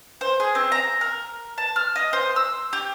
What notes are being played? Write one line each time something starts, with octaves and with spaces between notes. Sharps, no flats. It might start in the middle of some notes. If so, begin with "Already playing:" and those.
C5
G#4
C4
A#5
A#4
A5
F6
D#5
C5
E6
G4